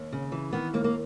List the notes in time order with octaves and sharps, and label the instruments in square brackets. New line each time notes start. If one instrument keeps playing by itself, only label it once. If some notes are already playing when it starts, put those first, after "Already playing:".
Already playing: [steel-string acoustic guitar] D#2
C#3
E3
D#3 B3
D#2 A#3
A#3